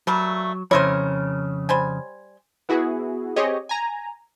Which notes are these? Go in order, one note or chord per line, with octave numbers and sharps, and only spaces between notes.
F#3 G3 A3 A#3
F2 C#3 E4 A#4 C5 C#5
G3 C5 G#5
B3 E4 F#4 G#4
C4 G4 G#4 C#5 D#5
G#5 A#5